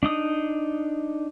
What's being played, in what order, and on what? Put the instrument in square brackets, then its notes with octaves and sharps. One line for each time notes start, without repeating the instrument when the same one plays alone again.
[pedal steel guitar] D4 D#4 D#6